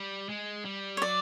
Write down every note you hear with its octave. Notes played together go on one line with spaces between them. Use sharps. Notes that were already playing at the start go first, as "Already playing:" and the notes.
Already playing: G3
G#3
G3
C#5
F#3 D5